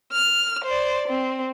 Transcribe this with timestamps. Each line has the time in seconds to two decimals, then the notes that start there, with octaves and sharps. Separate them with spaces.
0.12 F6
0.65 C5 D5
1.08 C4